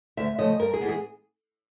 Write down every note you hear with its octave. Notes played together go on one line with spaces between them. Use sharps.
D2 E5
C#3 F3 A3 D#5
G2 A#4
G#4
E3 G#3 B3
G#4